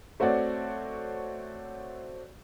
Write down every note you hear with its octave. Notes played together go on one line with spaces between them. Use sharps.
A3 C4 F#4 C#5 D5